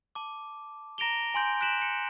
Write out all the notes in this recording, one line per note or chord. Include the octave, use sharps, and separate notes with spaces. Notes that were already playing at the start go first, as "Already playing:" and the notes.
A5 D6
A#5 A#6 D7 F7 G7
G#5 C6 G6
F#6 B6 D7 E7 F#7
C#7